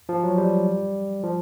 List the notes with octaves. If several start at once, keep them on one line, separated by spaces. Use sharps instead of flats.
F3
F#3
G3
F3